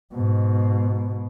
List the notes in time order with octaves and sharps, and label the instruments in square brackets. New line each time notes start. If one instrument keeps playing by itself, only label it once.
[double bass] G#2 B2